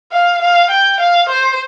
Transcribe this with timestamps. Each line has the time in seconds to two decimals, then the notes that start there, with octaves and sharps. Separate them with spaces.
0.12 F5
0.42 F5
0.70 G5
1.00 F5
1.29 C5